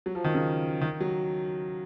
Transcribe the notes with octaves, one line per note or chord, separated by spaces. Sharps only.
F#3
F3
D#3
C#3
D#3
F#3